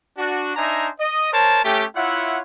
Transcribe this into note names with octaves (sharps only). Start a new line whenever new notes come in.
D4 F#4
D4 D#4 C5 E5 G#5 A#5
D#5
A#4 C5 C#5 A5
A3 C#4 G4
E4 F4 C#5 E5 F#5